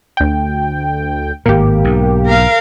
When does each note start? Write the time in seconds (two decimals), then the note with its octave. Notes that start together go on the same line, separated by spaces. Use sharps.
0.17 D2 G5
1.46 G#1 A2 A#3 G4
1.84 B1 G#2
2.27 A#4 F5